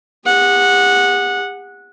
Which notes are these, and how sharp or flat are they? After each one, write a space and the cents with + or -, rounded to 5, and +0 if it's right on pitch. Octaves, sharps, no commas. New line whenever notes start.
G4 +45 F#5 -15